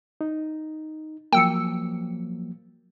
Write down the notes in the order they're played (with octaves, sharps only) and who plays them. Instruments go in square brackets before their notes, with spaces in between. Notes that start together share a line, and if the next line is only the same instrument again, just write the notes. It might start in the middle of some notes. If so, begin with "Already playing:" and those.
[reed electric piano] D#4
[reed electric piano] F3 F#3 A#3 [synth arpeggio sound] G5 E6 C#7